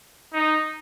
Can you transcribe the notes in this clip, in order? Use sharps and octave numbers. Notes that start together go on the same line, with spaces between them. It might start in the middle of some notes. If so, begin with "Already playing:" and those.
D#4